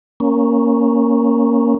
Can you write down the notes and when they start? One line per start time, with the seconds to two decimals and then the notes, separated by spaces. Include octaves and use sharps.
0.20 A#3 C#4